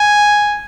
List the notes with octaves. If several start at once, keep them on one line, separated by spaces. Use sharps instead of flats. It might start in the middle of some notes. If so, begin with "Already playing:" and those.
Already playing: G#5